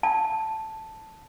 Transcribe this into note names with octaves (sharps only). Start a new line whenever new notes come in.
A5